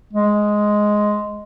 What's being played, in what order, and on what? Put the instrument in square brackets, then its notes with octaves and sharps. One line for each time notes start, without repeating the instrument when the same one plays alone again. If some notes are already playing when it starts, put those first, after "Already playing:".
[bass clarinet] G#3